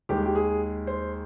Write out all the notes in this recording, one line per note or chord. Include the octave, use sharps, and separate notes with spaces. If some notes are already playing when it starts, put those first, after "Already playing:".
D#2 D#3 G#3 G4
G4
G#4
C5